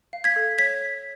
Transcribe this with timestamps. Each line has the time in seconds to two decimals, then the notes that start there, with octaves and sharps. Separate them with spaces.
0.13 F5
0.24 G#6 B6
0.36 A4
0.58 C#5 G#6 B6